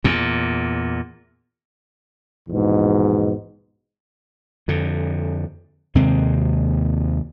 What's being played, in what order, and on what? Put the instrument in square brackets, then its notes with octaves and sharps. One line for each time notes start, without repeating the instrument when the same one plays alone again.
[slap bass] E2 A#2
[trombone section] A#1 E2 G#2 B2
[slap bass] F2 D3
D#2 C3 G#3 C4